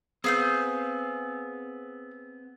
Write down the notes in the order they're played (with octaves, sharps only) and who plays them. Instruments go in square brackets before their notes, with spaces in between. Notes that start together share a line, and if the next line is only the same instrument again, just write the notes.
[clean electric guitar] B3 C4 [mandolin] G#4 F5 G6